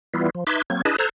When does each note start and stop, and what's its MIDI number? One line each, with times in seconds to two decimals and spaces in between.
0.14 0.30 52
0.14 0.30 55
0.14 0.30 59
0.14 0.30 64
0.14 0.30 65
0.35 0.44 53
0.47 0.62 63
0.47 0.62 71
0.47 0.62 76
0.47 0.62 84
0.47 0.62 86
0.47 0.62 92
0.70 0.82 54
0.70 0.82 58
0.70 0.82 60
0.70 0.82 92
0.85 0.96 62
0.85 0.96 64
0.85 0.96 68
0.85 0.96 71
0.85 0.96 75
0.85 0.96 81
0.98 1.09 69
0.98 1.09 72
0.98 1.09 82
0.98 1.09 90
0.98 1.09 92